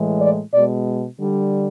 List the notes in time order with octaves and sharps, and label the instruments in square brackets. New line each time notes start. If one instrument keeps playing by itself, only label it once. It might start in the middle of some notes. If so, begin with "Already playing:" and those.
Already playing: [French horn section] A2 E3 G#3
D5
B2 G#3 D5
D3 G3